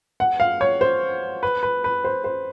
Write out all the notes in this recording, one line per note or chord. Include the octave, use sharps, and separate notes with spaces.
F#5
F5
C#5
C5
B4
B4
B4
C5
C5